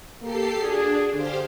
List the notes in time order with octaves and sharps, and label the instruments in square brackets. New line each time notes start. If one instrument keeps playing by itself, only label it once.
[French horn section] A#3 [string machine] G4 A4 C7
[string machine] D4 [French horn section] F#4 G#4
[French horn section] D3 [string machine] G4 C5 F5